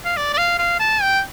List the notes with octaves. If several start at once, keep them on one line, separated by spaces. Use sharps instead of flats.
F5
D5
D5
F5
F5
A5
G5